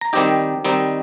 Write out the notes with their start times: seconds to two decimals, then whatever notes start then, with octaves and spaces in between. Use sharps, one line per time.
0.01 A#5
0.13 D#3 G3 C4 D#4 G4 G5
0.65 D#3 G3 C4 D#4